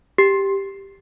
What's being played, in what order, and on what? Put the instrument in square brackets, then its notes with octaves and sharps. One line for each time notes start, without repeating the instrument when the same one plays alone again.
[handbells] G4